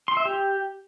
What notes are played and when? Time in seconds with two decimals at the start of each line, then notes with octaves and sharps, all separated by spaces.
0.08 C6
0.17 E5
0.25 G4